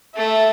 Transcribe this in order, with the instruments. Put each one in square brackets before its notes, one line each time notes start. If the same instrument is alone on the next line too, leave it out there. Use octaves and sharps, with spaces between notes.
[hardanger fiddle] A3 [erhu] E5